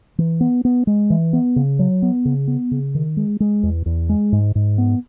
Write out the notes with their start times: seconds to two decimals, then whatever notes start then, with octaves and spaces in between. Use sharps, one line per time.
0.18 E3
0.41 B3
0.65 B3
0.87 G#3
1.10 E3
1.33 B3
1.56 C#3
1.79 F#3
2.02 B3
2.25 C#3
2.48 B3
2.71 C#3
2.95 D#3
3.17 G#3
3.40 G#3
3.63 E2
3.86 E2
4.09 G#3
4.32 G#2
4.55 G#2
4.78 B3